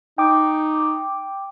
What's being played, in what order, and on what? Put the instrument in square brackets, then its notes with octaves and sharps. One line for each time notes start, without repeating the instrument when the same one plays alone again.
[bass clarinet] D#4 [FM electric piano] G5 D6